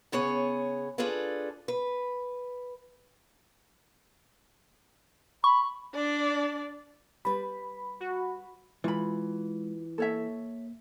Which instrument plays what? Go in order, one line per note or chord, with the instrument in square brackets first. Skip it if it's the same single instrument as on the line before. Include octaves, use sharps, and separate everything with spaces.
[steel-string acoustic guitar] C#3 B3 G#4 C#5
D4 F4 G#4 A4 B4 D5
B4
[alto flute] B5 [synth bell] C#6
[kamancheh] D4 D5
[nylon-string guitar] G3 B4 [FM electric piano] B5
[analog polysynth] F#4
[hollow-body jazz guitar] E3 [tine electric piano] G#3 [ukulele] F4 B5
[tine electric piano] A#3 [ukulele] A4 C#5 E5